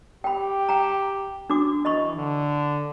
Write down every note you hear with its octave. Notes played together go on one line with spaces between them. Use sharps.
G4 G5 B5
G5 A#5
D4 F#4 D6
E3 D#5 B5 C#6
D3